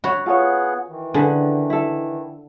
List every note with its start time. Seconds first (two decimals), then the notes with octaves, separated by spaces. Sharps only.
0.04 F#4 C#5 B5
0.26 B3 F4 G#4 A4 C#5 F#5
0.89 D#3 E3
1.14 D3 G#4 B4
1.70 E4 A4